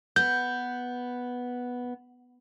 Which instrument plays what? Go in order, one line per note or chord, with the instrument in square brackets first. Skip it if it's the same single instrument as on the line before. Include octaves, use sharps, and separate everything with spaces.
[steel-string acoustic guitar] B3 [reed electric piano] G6